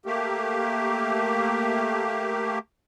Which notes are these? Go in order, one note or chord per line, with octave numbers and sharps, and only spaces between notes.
A3 A#3 G4